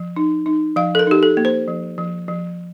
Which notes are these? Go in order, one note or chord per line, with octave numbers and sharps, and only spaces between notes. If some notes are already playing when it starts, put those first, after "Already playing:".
Already playing: F3
D#4
D#4
F3 F5
A4
A#4
D#4 G4
A4
A#3
C5
F3
F3
F3